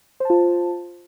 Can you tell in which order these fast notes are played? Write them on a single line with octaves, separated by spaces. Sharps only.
C5 A5 F4